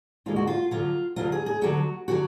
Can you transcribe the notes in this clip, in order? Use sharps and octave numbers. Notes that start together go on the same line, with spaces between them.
D#2 D3 G#3 F4
F#4
F4
D2 D3 F#3 F4
D2 D3 F#3 F4
G#4
G#4
D2 D3 F#3 F#4
D3 F#3 F#4